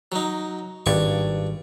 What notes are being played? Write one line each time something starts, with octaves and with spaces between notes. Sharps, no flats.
F#3 D#4
G#1 G2 D5 C#6